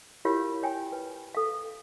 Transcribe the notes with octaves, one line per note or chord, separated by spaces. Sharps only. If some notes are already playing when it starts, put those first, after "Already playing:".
E4 F4 G4 A#4 C#5 F5
C#5 G5 G#5
B4
A4 F5